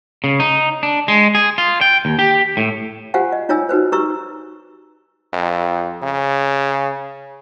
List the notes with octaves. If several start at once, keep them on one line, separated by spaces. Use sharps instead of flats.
C#3
D#4
D4
G#3
G#4
F4
G5
D#2
G4
A2
F4 G4 C5 F5 F#5 G#5
D#5
D#4 F4 C#5 G#5 E6
D#4 F#4 B4 C5
G4 B4 A#5 C#6 E6
F2
C#3